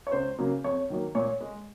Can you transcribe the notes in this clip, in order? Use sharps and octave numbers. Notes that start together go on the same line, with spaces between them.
C#5
C#2 C5
C#3 F#3 A#3
F2 C#5
D#3 F#3 A#3
A#2 C#5
G#3